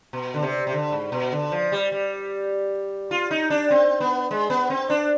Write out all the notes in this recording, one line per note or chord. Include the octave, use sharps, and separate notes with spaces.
B2
D3
C3
C3
D3
G#2
B2
D3
F3
G3
G3
F4
D#4
D4
C4
B3
G#3
B3
C4
D4